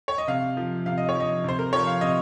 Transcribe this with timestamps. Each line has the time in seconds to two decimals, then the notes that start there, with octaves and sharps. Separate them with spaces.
0.08 C#5
0.18 D#5
0.28 C3 F5
0.57 F3
0.86 C3 F5
0.98 D#5
1.09 C#5
1.15 F3 D#5
1.44 C3 C5
1.59 A#4
1.73 F3 C#5
1.87 F5
2.01 C3 D#5